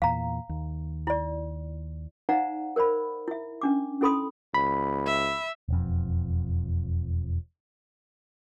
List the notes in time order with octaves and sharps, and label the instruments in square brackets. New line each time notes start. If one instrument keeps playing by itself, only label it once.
[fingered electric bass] E2 A#2 [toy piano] F5 A#5
[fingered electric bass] D#2
[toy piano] E4 D5
D#4 C5 D5 F5 F#5 A#5
A#4 C5 D5 B5
E4 E5
C#4 D4 D6
C#4 E4 A4 B5 C6 D#6
[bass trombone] C#2 [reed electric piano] B5
[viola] E5
[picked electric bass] E1 F2